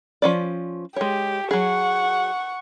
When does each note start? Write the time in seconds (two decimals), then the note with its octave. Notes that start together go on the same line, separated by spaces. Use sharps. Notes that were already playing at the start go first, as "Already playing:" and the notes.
0.22 F3 C#4 D5
0.96 G#3 G4 C#5
1.51 F#3 G#4 F#5 C#6